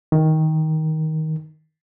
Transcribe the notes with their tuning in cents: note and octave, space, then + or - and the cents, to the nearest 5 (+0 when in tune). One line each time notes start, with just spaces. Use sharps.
D#3 +15